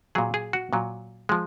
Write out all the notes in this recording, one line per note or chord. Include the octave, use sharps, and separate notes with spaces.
A#2 F#3 G#4
G#4
F#4
A#2 F#3
F3 G#3